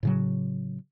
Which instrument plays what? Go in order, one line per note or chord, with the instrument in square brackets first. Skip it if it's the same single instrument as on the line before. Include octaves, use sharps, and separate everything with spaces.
[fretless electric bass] A2 C#3 F#3